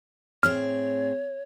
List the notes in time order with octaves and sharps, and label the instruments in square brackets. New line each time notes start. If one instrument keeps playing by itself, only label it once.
[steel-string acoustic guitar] A2 C4 G#4 [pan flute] C#5 [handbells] F6